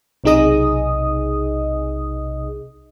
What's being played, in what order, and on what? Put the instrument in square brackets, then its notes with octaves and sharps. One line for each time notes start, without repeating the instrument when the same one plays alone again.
[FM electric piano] B1 C3 D#4 G#4 D#5 D#6